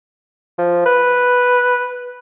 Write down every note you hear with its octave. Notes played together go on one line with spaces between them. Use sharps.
F3
B4